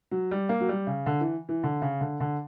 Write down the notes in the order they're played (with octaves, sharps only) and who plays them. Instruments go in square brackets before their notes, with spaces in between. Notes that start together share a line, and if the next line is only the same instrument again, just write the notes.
[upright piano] F#3
G3
A#3
F#3
G3
C#3
D3
E3
E3
D3
C#3
D3
D3